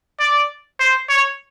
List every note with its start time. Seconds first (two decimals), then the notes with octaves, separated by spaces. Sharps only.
0.20 D5
0.80 C5
1.09 C#5